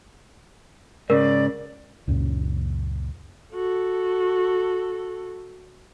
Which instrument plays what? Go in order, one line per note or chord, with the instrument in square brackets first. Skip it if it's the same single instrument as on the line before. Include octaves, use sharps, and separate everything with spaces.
[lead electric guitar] G#2 C#3 [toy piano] A#4 [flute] D5
[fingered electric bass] C#2 F#2 A#2 C#3
[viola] F#4 A4